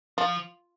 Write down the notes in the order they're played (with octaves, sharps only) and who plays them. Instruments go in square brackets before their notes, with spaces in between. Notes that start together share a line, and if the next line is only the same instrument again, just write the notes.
[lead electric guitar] F3 [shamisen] F4